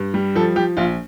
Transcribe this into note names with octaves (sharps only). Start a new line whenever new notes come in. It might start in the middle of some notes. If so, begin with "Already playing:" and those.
Already playing: G2
G3
F3 A4
F3 G4
A#1 F4